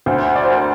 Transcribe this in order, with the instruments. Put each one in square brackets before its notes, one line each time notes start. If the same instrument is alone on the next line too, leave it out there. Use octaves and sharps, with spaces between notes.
[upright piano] D2 [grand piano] C5
[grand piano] D5
C5
A#4